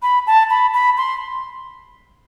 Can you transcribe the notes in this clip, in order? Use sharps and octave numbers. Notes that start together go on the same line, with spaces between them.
B5
A5
B5
B5
C6